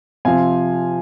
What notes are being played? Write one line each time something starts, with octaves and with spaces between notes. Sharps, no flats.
C3 F3 C4 F5 G#5